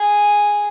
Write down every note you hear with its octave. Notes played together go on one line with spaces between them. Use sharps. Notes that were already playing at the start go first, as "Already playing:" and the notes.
Already playing: G#4